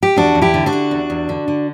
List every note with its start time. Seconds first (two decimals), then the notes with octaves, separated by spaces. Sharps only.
0.03 G4
0.16 E2 D4 F#4
0.35 E2
0.42 E4 G4
0.54 D3
0.66 D4 F#4
0.73 D3
0.91 E2
1.10 E2
1.29 D3
1.48 D3